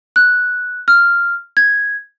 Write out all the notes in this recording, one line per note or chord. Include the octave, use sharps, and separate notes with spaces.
F#6
F6
G#6